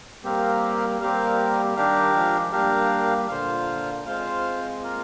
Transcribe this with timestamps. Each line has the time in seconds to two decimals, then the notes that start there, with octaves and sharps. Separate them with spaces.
0.24 G3 A#3 C4 G4 A#4 F5
1.00 G3 A#3 C4 G4 A#4 F5
1.76 D#3 G3 D4 G4 A#4 F5
2.14 F3 G#3
2.53 G3 A#3 D4 G4 A#4 F5
3.29 A#2 D3 F4 C5 F5
4.06 G#3 C4 F4 C5 F5
4.81 A#3 F4 A#4 F5